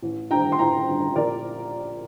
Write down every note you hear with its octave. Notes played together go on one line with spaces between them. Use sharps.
A1
G2 D3 G5 A#5
C6
A1 G5 A#5
G2 D3
A#1 A#4 D5